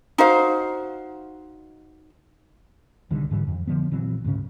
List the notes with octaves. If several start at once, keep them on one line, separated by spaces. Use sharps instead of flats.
D#4 F#4 C5 F5
B1 D3 D#3 G3
G#2 D3 E3 G3
F2
D3 F3 B3
A#1 E3 F#3 C4
D2 G#2 C#3 C#4